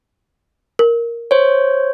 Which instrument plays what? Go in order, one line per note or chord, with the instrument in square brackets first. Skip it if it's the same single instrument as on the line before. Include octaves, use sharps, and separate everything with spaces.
[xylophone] A#4
[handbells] C5 C#5